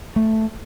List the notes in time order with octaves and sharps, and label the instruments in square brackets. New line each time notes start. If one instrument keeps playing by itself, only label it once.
[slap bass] A3